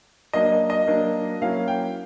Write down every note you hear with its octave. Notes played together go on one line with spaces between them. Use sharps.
F#3 A#3 D4 D#5
D#5
D#5
F#3 A#3 D4
F#3 A#3 C#4 E4 F5
G5